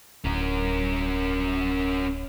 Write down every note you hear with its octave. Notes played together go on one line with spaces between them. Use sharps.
D1 C#4 A#4